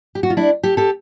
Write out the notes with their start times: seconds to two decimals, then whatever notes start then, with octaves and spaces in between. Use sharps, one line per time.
0.15 G4
0.23 F#4
0.30 F4
0.37 D4 E4
0.63 G4 A4
0.77 G4 A4